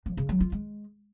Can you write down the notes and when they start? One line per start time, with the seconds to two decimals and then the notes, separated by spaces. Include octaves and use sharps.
0.06 F3
0.17 C#3
0.29 F#3
0.41 F4
0.52 G#3